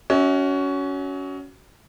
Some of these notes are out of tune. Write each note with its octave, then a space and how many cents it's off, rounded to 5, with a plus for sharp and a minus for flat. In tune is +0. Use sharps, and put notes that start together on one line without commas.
C#4 +20 F#4 +15 E5 -45